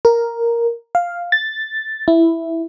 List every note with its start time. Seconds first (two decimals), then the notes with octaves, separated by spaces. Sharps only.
0.05 A#4
0.95 F5
1.32 A6
2.08 E4